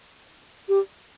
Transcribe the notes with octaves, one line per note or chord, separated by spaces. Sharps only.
G4